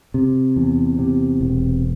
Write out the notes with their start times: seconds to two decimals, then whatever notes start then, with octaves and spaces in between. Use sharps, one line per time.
0.14 C3
0.56 E2
0.99 C3
1.41 E1